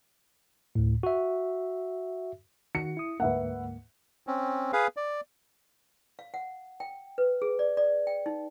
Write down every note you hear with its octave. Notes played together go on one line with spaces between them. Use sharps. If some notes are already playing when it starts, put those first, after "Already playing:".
D2 A2
F#4 E5
D#3 F#4 C#7
E4 D#6
D2 G#2 A#3 B4 E5 F#5
C4 C#4
G#4 B4 F5
D5
F5
F#5
G5
B4
G#4
D5
D5
G5
D#4